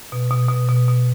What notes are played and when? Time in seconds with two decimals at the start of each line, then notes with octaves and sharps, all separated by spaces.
0.12 B2
0.31 B2
0.49 B2
0.69 B2
0.88 B2